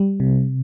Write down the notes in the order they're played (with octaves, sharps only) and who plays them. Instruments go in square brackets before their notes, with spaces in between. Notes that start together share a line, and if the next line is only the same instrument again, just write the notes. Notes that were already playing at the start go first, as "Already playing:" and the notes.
Already playing: [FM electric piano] G3
C3